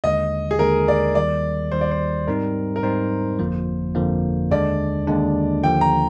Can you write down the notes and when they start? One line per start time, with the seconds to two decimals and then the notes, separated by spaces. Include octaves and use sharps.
0.04 D#2 D3 G#3 D#5
0.51 G#4
0.59 D#2 D3 G#3 A#4
0.88 D5
1.15 D#2 D#3 G3 D5
1.72 D#2 D#3 G3 C5
1.81 D5
1.91 C5
2.27 G#2 G3 C4 D#4 A#4
2.76 A#4
2.83 G#2 G3 C4 D#4 C5
3.39 G1 F2 D3 F3 A#3
3.95 G1 F2 D3 F3 A#3
4.51 D#2 D3 G#3 D4 D5
5.07 D#2 D3 G#3 D4
5.63 D#2 D3 F3 G5
5.81 A#5